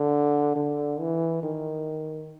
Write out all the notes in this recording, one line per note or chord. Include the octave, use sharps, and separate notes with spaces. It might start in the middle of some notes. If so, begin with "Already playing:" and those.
Already playing: D3
D3
E3
D#3